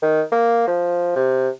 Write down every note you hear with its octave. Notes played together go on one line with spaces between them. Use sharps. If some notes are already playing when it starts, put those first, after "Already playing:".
D#3
A#3
F3
C3